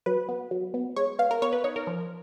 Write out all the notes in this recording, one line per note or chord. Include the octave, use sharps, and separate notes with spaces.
F#3 B4
B3
F#3
B3
G#3 C#5
B3 F5
A#4
B3 C#5
B4
D#4 C#5
A#4
F3